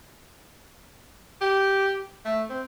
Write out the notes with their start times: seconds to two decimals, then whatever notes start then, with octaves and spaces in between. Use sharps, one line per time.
1.41 G4
2.25 A3
2.50 C4